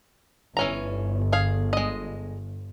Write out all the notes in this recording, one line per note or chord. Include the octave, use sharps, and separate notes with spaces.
G1 E3 C#4 A#5
G#4 F5
G#3 D#5